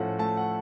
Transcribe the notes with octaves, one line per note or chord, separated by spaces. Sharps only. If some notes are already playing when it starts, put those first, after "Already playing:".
Already playing: A2 F3 C#4 A4 F#5
A3 A5
F#5